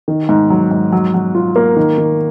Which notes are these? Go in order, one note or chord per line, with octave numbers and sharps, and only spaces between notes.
D#3
G#2
F#3
G#2
F#3
F#3
F4
A#3
D#3
D#3